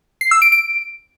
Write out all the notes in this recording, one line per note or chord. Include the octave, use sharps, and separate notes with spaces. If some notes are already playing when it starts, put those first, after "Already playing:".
C7
E6
D7
D7